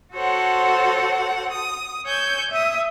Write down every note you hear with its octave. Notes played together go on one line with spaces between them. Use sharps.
F#4 A4 C5 C#5 F#5
D#6
C#5 G#5 E6 G6
E5 D#6